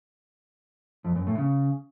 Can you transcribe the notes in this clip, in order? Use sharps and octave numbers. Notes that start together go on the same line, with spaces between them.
F2
F#2
A2
C#3